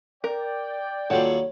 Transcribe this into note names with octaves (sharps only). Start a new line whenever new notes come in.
A#4 D5 G5
D#2 F#3 G3 F4 A4 C#5 F#5